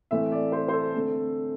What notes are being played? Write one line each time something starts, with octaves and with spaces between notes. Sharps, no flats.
A2 E3 A3 C4 E5
D5
C5
C5
A4
D3 A3 C4